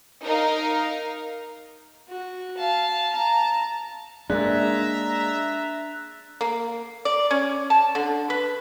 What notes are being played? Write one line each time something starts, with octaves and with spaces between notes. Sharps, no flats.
D#4 A#4 F5
F#4
F5 A5
A5 A#5
G#3 A#3 D4 E5 A#5 F#6 A6 B6
A#3
D5
C#4
A5
D3
B4